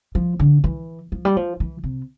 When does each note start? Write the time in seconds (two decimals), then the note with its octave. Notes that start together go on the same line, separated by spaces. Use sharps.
0.15 F3
0.39 D3
0.64 E3
1.12 F3
1.25 G3
1.37 F3
1.60 E3
1.84 C3